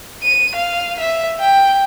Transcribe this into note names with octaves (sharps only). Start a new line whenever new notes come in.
D#7
F5
E5
G5